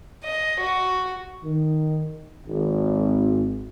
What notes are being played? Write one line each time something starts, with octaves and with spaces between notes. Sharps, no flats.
D#5
F#4
D#3
G#1